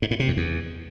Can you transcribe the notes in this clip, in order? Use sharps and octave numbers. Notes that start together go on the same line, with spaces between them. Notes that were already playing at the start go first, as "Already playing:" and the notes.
G#2
A2
C3
F2
E2